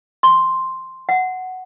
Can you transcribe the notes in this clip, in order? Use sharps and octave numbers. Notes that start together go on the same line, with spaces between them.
C6
F#5